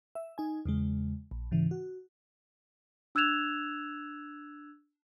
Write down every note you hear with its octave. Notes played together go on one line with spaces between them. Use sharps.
E5
D#4 G#5
E2 C#3 G#3
A#1
G#2 C#3 E3
F#4
D4 E6 F#6 G#6 E7 F7